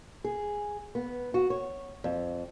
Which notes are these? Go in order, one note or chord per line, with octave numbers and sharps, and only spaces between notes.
G#4
B3
F#4
C#5
F2